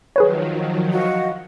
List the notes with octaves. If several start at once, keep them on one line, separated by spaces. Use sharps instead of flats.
D#3 F3 F#3 G#4 B4 C#5
F#4 D#5 F5